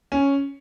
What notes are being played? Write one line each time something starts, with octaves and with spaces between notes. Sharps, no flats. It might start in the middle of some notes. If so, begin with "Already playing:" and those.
C#4